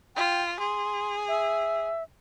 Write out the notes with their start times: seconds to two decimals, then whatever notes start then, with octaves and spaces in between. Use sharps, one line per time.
0.16 F4 G5
0.60 G#4 C6
1.28 E5